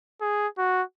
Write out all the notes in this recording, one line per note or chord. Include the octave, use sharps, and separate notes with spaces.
G#4
F#4